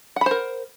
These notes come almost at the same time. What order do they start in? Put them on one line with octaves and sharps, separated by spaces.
F#5 B5 C5 A#4